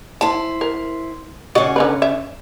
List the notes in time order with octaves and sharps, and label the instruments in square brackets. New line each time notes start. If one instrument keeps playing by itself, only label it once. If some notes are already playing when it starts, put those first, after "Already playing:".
[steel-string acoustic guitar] E4 C5 [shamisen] A5
[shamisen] A#4
[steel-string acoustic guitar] C#3 C#4 [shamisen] F#4 D5 D#5
[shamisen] D3 D#4 B4
E5